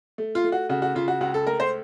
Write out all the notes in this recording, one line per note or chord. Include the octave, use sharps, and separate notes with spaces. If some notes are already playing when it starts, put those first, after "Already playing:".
A3
F4
A3
F#4
C#3 F#4
F#4
C#3 F4
F#4
C#2 F#4
A4
A3 A#4
C5